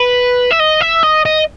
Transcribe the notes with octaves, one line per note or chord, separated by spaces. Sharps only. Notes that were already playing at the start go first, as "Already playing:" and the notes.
Already playing: B4
E5
D#5
E5
D#5
D#5